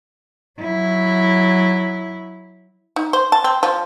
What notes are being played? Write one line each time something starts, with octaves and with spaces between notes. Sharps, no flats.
F#3 E4
D#4
C5
A5
C4
F3